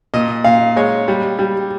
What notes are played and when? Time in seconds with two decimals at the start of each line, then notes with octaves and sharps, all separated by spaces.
0.14 A#2 D#5
0.44 A#2 F5
0.76 G#3 C#5
1.08 G3
1.39 G3